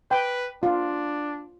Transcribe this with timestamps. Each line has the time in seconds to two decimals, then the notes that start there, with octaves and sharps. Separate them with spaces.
0.11 B4 G5
0.63 D4 F4